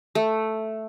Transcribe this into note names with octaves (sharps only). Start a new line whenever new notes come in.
A3